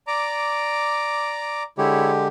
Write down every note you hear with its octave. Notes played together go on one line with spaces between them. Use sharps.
D5 A#5 D6
D3 G#3 E4 G4 C#5